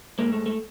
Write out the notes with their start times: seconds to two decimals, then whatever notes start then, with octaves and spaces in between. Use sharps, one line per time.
0.19 G#2 F3 G#3 A#3
0.32 A3
0.46 A3